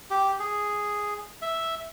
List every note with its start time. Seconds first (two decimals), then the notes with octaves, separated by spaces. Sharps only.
0.10 G4
0.40 G#4
1.42 E5